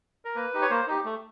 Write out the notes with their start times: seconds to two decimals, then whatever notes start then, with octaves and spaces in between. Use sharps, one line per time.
0.25 A#4
0.35 A#3 B4
0.54 D#4 G4
0.62 C#5
0.70 A#3 C5
0.87 D#4 G4
1.05 A3